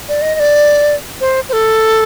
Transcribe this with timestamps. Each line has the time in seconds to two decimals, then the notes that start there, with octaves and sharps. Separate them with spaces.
0.09 D5
0.22 D#5
0.35 D#5
0.40 D5
1.21 C5
1.49 C5
1.53 A4